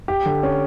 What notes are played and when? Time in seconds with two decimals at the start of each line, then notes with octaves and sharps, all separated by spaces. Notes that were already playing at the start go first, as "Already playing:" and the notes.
0.08 G4
0.26 D3
0.43 C#4